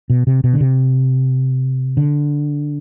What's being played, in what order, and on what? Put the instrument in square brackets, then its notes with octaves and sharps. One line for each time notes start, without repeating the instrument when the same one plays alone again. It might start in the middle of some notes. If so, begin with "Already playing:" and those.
[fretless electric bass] B2
C3
B2
D3
C3
D3